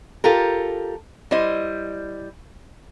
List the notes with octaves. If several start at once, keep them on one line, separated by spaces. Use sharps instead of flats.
F4 G4 A4 A#4
G3 E4 C5 D#5